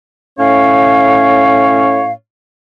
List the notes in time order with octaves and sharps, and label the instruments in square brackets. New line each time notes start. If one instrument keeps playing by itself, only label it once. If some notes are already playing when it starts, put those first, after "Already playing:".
[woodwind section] A2 C#4 C#5 F5